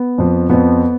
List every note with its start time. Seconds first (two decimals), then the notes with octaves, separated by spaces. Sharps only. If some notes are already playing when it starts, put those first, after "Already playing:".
Already playing: B3
0.18 F2 F3
0.49 F2 F3 B3